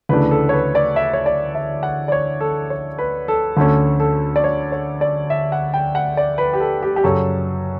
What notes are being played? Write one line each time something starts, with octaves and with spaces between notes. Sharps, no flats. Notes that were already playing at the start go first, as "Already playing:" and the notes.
D2 C#3 E3 A3 D4 B4
A4
C#5
B4
D5
E5
C#5
D5
E5
F#5
D5
C#5
A4
C#5
B4
A4
D2 D3 A3 C#4 A4
A4
D5
C#5
C#5
D5
E5
F#5
G5
F#5
D5
B4
G4
A4
G4
G4
F#2 C#3 F#3 C#4 A4